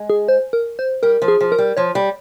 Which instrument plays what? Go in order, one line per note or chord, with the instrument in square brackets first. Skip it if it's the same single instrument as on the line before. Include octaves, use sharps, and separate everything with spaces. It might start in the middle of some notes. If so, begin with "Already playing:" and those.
Already playing: [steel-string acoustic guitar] G#3
[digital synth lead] G#4
C5
A#4
C5
[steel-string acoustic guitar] G3 [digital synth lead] A#4
[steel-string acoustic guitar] F3
[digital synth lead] G#4
[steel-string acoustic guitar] F3
[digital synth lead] A#4
[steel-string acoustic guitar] G3
[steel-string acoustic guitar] F3 [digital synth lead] C#5
[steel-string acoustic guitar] G3